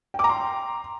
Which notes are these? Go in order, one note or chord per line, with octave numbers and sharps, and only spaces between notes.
G5 A#5 C6 D6